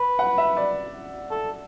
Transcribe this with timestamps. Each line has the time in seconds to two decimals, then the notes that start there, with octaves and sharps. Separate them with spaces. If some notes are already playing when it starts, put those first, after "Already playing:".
Already playing: B4
0.19 F#5
0.38 E5
0.57 D5
1.31 A4